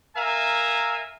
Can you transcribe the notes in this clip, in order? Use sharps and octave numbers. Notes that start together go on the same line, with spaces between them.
A#4 E5 F5 G#5 A#5